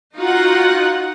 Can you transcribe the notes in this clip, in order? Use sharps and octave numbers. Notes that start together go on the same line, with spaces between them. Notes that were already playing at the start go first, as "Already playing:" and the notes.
D#4 F4 F#4 F#5